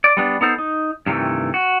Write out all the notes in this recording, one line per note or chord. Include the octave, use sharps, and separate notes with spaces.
D5
G3 B3 D4
B3 D#4 A4 C5
D#4
G2 C3 D#3 E3 A3
F#4